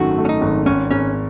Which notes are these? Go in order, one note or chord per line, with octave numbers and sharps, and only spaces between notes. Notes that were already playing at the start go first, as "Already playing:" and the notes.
Already playing: G#1 F#2 D#3 A3 F#4
A3
C#4
D#4
G#1
G#1 C#4
G#1 C#4